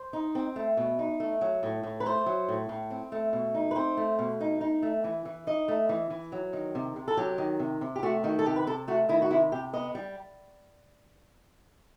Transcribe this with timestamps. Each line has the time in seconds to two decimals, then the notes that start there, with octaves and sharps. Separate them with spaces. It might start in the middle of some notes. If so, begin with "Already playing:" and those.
Already playing: C5
0.13 D#4
0.35 C4
0.56 A3
0.77 B2
0.99 D#4
1.20 A3
1.41 F#3
1.63 A2
1.83 A2
2.00 B4
2.06 A3 C5
2.26 F#3
2.48 A2
2.69 A2
2.90 C4
3.12 A3
3.33 B2
3.54 D#4
3.71 B4
3.76 C4 C5
3.97 A3
4.19 B2
4.41 D#4
4.61 D#4
4.83 A3
5.04 E3
5.25 E3
5.47 D#4 D#5
5.68 A3
5.89 E3
6.10 E3
6.32 F#3
6.53 D#3
6.75 C3
6.96 C3
7.08 A4
7.17 F#3 G4
7.38 D#3
7.59 C3
7.81 C3
7.96 G4
8.03 A3 F#4
8.24 D#3 F#4
8.39 A4
8.45 C3 G4
8.56 B4
8.67 C3 A4
8.88 A3 F#4
9.09 D#3 E4
9.22 F#4
9.31 C3 E4
9.52 C3 G4
9.73 B3 D#5
9.95 G3